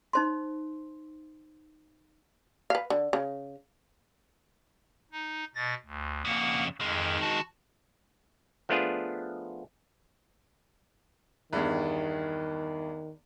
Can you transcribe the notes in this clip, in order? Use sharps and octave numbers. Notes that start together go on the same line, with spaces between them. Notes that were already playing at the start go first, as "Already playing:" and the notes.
D#4 C5 C6
B4 F5
D3
C#3
D#4
B2 A6 A#6
D2
F2 C#3 A#3 F#5
F2 D#3 G#3
F#4 A5
F3 A3 B3 D4 F4 G#4
E2 G2 D#3